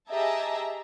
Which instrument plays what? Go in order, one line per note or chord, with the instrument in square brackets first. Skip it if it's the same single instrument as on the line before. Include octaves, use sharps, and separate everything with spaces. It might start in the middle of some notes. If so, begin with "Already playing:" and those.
[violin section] G4 G#4 D#5 E5 A5 A#5